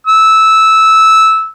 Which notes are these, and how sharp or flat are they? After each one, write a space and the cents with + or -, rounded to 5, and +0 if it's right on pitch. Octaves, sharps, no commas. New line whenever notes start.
E6 -10